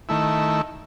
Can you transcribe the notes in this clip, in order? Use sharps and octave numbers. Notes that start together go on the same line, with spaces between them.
D#3 A3 E4